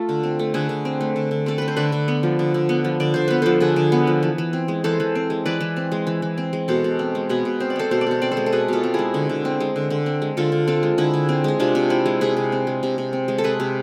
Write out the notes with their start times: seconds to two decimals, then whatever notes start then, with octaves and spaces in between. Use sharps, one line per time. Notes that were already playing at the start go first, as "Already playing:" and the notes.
Already playing: A3 F4 A4
0.09 D3
0.23 C4
0.39 A3
0.54 D3 G#4 B4
0.69 D3
0.85 C4
1.01 A3
1.16 D3
1.31 D3
1.46 C4 A4
1.58 A3 B4
1.68 C5
1.76 D3 B4 D5
1.92 D3
2.08 B3
2.23 F3
2.39 D3
2.54 D3
2.69 B3
2.84 F3
3.00 D3 D5
3.14 D3 C5
3.28 B3 B4
3.42 F3 A4 C5
3.60 D3 G#4 B4
3.76 D3
3.92 B3
4.07 F3
4.23 E3
4.38 E3
4.53 C4
4.68 G#3
4.84 E3 A4 C5
5.00 E3
5.15 C4
5.30 G#3
5.46 E3 B4 D5
5.61 E3
5.76 C4
5.92 G#3
6.07 E3
6.22 E3
6.38 C4
6.53 G#3
6.68 B2 A4 C5
6.84 B2
6.99 C4
7.15 G#3
7.29 B2 G#4 B4
7.45 B2
7.60 C4 C5
7.70 D5
7.76 G#3 A4 C5
7.91 B2 C5
8.01 D5
8.07 B2 C5
8.22 C4 D5
8.31 A4 C5
8.37 G#3
8.46 A4
8.52 B2 G#4 B4
8.68 B2 F4 A4
8.83 C4
8.94 G#3 E4 G#4
9.14 D3
9.29 D3
9.45 C4
9.60 G#3
9.76 D3
9.90 D3
10.06 C4
10.22 G#3
10.37 D3 F4 A4
10.52 D3
10.67 C4 F4 A4
10.83 G#3
10.98 D3 E4 G#4
11.14 D3
11.29 C4
11.44 G#3 G#4
11.60 C3 D4 F4
11.75 C3
11.90 C4 E4
12.06 G#3
12.21 C3 G#4 B4
12.37 C3
12.52 C4
12.67 G#3
12.83 C3
12.98 C3
13.13 C4
13.28 G#3
13.38 A4
13.44 C3 G#4 B4
13.60 C3